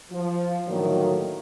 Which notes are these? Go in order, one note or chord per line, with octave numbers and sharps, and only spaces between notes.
F3
A2 D3 D#3 F3 F#3 A#3